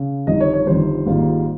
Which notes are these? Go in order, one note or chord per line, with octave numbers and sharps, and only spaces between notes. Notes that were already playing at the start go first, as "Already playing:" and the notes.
Already playing: C#3
G1 F2 D#3 G3 D#5
C#5
C#5
G1 F2 D#3 G3 C5
G#1 G#2 G3 A#3 F4